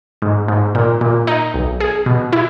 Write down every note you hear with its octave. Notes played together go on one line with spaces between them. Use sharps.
G#2
G#2
A#2
A#2
D#4
B1
G#4
B2
E4